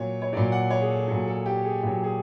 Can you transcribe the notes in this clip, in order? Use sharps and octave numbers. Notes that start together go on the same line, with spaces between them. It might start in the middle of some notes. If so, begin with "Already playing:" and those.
Already playing: A#2 F#3 C#5
C#5
A#2 F#3 D5
F#5
C#5
G#4
A4
A#2 F#3 A4
A4
G4
G#4
A#2 F#3 G4
G#4